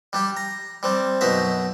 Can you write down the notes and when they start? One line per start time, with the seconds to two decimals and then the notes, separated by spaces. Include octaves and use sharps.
0.13 G3 D4 G4
0.37 A#5
0.83 G3 C4 D4
1.21 F#2 B2 F#3 D#4 E5 A#5